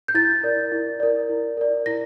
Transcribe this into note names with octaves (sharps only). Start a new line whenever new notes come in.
G6
E4 A6
A#4 D5
E4
A#4 D5
E4
A#4 D5
E4 A#6